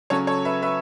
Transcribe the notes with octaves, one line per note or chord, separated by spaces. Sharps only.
C#3 F#3 C#4 A4 C#5
A4 C#5
B4 E5
B4 E5